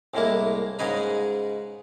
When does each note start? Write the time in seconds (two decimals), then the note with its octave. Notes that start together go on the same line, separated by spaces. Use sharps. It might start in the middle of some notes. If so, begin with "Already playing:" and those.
0.14 C2 A2 G#3 A#3 E4
0.79 G#2 C#3 G#4 B4 D#5 A#5